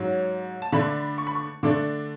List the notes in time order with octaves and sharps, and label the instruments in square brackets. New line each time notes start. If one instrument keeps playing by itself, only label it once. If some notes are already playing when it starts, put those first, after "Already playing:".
Already playing: [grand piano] G#2 F#3 C#4
A5
D3 A3 D4 B5
C#6
B5
C#6
D3 A3 D4 D6